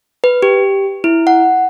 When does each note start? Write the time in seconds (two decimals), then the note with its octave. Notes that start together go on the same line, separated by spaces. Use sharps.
0.24 B4
0.42 G4
1.04 E4
1.27 F#5